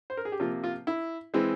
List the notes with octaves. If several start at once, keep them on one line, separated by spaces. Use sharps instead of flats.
C5
A#4
G#4
G4
C3 F3 A#3 F4
F4
E4
E3 G#3 C4